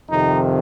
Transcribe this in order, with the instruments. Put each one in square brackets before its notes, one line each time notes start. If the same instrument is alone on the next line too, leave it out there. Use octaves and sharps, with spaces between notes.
[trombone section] F2 C3 D#3 D#4